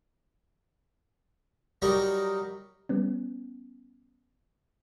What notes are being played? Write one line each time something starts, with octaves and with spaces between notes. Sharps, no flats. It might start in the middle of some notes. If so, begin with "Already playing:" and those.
F#3 G3 D#4 A#4 D5
G3 B3 C#4